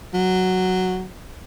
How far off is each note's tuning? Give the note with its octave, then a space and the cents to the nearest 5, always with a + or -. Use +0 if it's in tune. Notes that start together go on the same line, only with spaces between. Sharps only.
F#3 +0